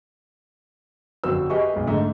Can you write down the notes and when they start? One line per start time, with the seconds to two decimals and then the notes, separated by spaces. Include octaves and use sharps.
1.24 G1 F2 F#3 F#4 C5 E6
1.50 G4 G#4 B4 D#5 E5 C#6
1.73 B1 G#3
1.87 G#2 D3 A3 D#4 E5